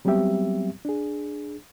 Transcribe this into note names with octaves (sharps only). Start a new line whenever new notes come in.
F#3 G3 B3 C4 G4 E5
D4 G#4